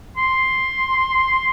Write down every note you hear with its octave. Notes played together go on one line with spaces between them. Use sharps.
C6